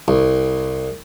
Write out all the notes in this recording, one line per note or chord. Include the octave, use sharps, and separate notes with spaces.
C2